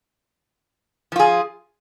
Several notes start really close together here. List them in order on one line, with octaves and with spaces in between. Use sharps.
F3 F4 G#4